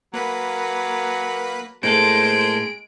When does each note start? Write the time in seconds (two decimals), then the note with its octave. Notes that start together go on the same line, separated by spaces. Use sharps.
0.14 F#3 A#3 B4 B5
1.83 A2 G#3 A#3 A4 C5 G6 D7